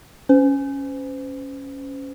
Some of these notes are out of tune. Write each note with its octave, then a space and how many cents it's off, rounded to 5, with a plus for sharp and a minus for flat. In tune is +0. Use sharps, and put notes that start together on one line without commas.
C#4 +0 C5 -40